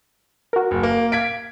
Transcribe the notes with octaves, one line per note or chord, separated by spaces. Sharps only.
F#4 A#4
F#1
A#3
F5 G#6 B6 D7